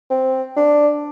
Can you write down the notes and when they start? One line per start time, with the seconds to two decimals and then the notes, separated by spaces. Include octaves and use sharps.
0.10 C4
0.56 D4